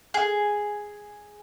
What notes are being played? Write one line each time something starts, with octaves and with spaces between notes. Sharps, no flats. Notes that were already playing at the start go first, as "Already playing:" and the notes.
G#4